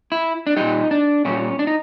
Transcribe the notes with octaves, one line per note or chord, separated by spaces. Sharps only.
E4
D4
A#2 G3 D#4
D4
A#2 G3 C#4
D4
D#4